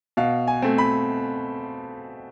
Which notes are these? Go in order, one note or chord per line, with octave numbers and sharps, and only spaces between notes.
B2 F5
G#5
A3 C4
B5